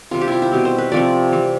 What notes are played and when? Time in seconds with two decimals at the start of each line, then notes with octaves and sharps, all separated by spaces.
0.11 C3 G3 C4 F4
0.21 G4
0.28 E4 F4
0.42 E4
0.52 B2 G3 C4
0.65 C5
0.78 B4
0.92 C3 F3 A3 C4 D5
1.32 E3 G3 C4